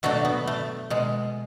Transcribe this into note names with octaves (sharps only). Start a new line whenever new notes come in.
B2 F#3 A3 D4 F#4
B3
A3
B2 G#3